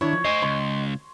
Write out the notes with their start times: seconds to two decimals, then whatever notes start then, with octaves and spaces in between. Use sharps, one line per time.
0.01 D#3 D4 E4 C#5
0.13 F3
0.25 C5 D#5 G#5
0.42 C#2 C6